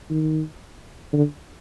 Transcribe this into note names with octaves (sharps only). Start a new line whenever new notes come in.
D#3
D3